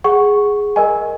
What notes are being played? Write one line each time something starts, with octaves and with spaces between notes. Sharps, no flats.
G#4 F#5 C#6
A#4 D#5 G#5